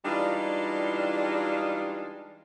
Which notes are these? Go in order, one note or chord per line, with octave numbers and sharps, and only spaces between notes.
E3 G3 G#3 D4 D#4 F4